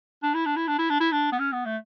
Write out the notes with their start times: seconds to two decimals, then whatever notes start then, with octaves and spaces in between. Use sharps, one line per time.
0.23 D4
0.34 E4
0.46 D4
0.56 E4
0.68 D4
0.79 E4
0.90 D4
1.01 E4
1.12 D4
1.32 B3
1.40 C#4
1.53 B3
1.65 A3